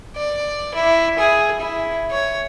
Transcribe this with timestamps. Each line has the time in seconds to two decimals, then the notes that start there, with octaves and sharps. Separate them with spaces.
0.16 D5
0.74 E4
1.19 G#4
1.60 E4
2.11 C#5